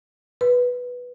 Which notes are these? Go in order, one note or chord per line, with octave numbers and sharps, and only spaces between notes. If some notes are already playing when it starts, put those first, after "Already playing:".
B4